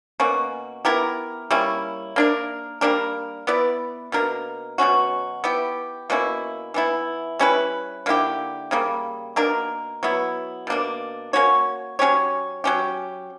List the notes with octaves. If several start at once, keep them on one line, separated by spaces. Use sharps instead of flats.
B2 A#3 C#4 F#4
B3 E4 G4 A#4
G3 A#3 C#4 E4
A#3 D4 A#4
G3 A#3 D4 A#4
B3 E4 B4 D5
B2 A#3 D4 A#4
B2 F#3 C#4 F#4
B3 E4 G4
B2 A#3 C#4 E4
E3 B3 E4
G3 C#4 E4 B4
D3 A#3 E4 G4
C#3 G3 A#3
B2 A#3 D4 A#4
F#3 B3 E4
B2 A#3 D4
A#3 C#4 F#4 C#5
F#3 C#4 G4 C#5
F#3 C#4 G4